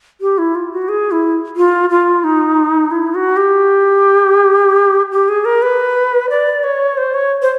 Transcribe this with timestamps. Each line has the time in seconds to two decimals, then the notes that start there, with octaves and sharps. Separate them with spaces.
0.21 G4
0.38 E4
0.55 F4
0.72 F#4
0.89 G#4
1.11 E4
1.57 F4
1.90 F4
2.24 D#4
2.91 E4
3.15 F#4
3.37 G4
5.12 G4
5.29 G#4
5.45 A#4
5.62 B4
6.30 D5
6.64 C#5
6.98 C5
7.14 C#5
7.42 C5